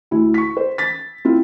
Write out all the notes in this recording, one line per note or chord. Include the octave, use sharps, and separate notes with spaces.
D2 E4
C#6 B6
C5
A6 B6
C4 E4 F4